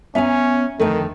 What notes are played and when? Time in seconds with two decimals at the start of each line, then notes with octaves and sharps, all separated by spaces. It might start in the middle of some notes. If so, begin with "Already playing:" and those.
0.15 B3 C#4 E5 G#5 A#5
0.80 F2 D3 D#3 A3